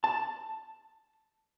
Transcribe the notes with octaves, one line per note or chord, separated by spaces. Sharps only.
A5